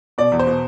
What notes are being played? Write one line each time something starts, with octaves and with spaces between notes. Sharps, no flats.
B2 D5
E2
C5
B2